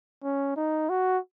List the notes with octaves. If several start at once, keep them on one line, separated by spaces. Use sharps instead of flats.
C#4
D#4
F#4